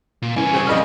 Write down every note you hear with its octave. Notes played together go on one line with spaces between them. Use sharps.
A#2
C2 E3 C#4 G#5
C#3 C4 G#4
F2 G#4 D5 D#5 B5 F6